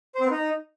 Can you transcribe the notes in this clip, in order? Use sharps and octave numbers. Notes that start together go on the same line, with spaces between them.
C5
C4
B3
D#4